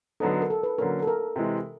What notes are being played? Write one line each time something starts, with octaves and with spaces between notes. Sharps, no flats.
D3 F#3 B3 D#4 A4
A#4
A4
B4
D3 F#3 A#3 C#4 A#4
A4
A#4
C3 E3 G#3